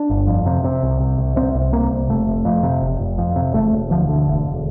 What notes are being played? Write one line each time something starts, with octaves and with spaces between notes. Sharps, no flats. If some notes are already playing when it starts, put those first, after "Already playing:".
Already playing: D4
G1
F2
C3
C3
C2
C3
C2
C3 C4
C2
C3 A#3
C2
F1 A3
F1
F2
C3
F1
F1
F2
C3
E1 A3
E1
D2 F3
D3
E1
E1